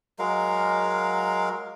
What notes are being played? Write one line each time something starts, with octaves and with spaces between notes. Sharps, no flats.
F#3 G#3 A#4 F5